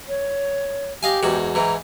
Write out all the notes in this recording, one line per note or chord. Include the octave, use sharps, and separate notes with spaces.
C#5
G4 D#5 F5 G#5
E2 G#2 F#4
G#2 E3 A#5